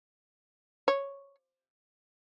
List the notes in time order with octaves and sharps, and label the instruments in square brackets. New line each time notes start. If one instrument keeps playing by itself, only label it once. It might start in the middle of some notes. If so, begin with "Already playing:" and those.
[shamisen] C#5